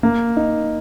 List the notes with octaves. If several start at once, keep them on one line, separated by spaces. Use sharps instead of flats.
A#3
D#4